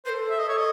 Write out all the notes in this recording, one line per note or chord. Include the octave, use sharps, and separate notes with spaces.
B4 C5
A4
E5
D#5
C#5
D#5